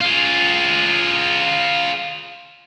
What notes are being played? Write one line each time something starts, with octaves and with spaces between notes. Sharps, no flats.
F4 G#4